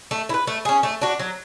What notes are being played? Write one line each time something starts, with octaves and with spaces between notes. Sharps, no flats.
A3
E4
B4
A3
C#4 G#4
A3
D4 F#4
F#3